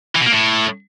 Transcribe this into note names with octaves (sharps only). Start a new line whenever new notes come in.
E3
B2
A#3
A2